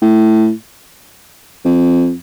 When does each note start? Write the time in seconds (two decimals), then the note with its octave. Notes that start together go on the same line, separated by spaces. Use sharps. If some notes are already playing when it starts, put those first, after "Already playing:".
0.02 A2
1.65 F2